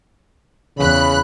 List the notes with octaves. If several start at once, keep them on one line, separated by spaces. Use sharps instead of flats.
E2 C#3 B5 F#6